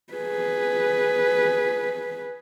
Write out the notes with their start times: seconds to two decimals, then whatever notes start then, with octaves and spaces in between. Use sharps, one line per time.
0.13 G#4 B4